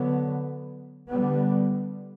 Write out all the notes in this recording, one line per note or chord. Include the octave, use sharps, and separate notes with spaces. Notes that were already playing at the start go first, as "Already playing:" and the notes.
Already playing: D3 F#3 B3
D3 G3 B3